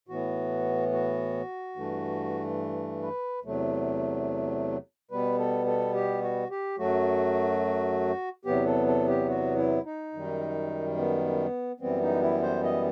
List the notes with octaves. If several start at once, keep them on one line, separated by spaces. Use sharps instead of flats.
A2 E3 B3 F#4
F#4
G2 E3 A3
B4
E2 C3 F#3 A3
B2 G3 B3 B4
A4
A4
G4
F#4
G4
F#2 F#3 A3 F#4
E2 C3 F#3 B3 G4
A4
A4
G4
F#4
E4
D#4
F#2 D#3 G3
B3
F#2 E3 G3 B3 C4
D#4
E4
C5
D#5